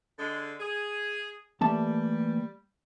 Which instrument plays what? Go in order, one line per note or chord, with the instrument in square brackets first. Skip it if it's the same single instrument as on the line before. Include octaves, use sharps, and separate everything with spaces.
[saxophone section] D3 G#3
G#4
[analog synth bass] E3 [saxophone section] G3 [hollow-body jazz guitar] A3 A#3 A5